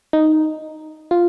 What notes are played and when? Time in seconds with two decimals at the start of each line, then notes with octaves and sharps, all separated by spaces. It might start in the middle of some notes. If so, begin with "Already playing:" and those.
0.13 D#4
1.11 F4